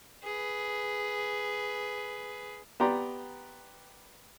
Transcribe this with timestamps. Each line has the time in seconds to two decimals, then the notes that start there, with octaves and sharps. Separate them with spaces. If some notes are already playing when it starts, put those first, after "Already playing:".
0.24 G#4 B4
2.80 B3 G4 D5 G5 A#5 C6